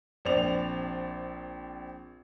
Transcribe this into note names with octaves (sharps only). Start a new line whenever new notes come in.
A#1 C4 D5 F7